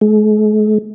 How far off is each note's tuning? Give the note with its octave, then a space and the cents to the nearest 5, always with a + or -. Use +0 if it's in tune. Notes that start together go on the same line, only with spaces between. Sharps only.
G#3 +45